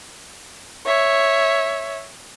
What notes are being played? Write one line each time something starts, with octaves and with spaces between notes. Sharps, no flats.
C#5 E5